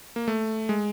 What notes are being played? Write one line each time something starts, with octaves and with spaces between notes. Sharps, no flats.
A#3
A3
G#3